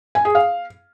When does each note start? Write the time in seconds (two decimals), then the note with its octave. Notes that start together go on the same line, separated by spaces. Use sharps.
0.15 G#5
0.25 G#4
0.35 F5